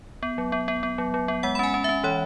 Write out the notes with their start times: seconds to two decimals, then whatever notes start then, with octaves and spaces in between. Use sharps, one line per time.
0.23 B3
0.38 F#3
0.52 B3
0.68 B3
0.83 B3
0.98 F#3
1.14 F#3
1.28 B3
1.43 G#3 F#5
1.55 B5
1.59 C#4 G#5
1.74 C#4
1.84 C#4 E5
2.03 E3 C#5